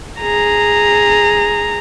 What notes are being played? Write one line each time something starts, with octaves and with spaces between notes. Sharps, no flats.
G#4 A#5